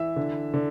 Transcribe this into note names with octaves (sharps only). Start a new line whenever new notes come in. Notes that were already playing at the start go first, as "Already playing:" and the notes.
Already playing: E3 E5
D3
D3